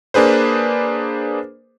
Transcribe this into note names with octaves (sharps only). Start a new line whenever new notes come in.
A#3 D4 G#4 B4 C5